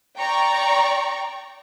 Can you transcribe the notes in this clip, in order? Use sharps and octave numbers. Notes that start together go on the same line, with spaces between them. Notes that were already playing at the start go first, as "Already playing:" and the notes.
D5 G5 A#5 C#6